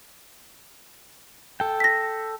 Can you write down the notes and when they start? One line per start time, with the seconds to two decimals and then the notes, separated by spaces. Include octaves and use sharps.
1.60 A4 G5
1.80 A#6 B6